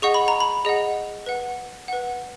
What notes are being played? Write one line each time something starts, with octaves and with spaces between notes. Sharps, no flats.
G#4 D#5 F#5 C#6
B5
A#5
B5
G#4 D#5 F#5
B4 F#5
B4 F#5